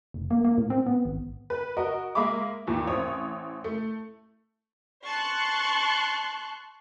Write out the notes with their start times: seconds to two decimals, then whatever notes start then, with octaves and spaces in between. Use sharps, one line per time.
0.14 F1
0.31 A#3
0.44 A#3
0.58 A2
0.70 C4
0.86 B3
1.05 G#1
1.50 B4
1.77 F#4 A#4 D#5
2.15 G#3 A#3 E5 B5 D6
2.67 D#2 A#2 E3
2.87 A1 C4 C#5 D#6
3.64 A3
5.05 A5 C6 C#6 F#6